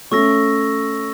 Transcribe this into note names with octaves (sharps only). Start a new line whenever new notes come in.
A3 C#4 C#6 E6 A#6